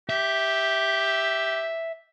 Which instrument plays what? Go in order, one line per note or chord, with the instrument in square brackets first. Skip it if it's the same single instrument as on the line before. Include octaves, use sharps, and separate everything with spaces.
[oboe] G4 [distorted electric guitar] E5